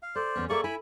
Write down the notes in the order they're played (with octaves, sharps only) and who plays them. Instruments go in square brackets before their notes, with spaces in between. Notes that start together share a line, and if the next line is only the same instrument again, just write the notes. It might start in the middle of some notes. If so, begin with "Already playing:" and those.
[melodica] F5
[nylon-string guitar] A4 [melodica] C5 D5
[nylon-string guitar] E2 B3 C#4
[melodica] A#3 D5 C#6 [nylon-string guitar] G#4 A4 E5
[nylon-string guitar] E4 [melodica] G#5 B5